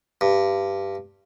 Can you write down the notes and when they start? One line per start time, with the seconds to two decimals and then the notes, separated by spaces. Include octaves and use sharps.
0.21 G2